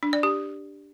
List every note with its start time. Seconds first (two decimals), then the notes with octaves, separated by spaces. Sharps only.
0.03 D4
0.13 D5
0.23 G4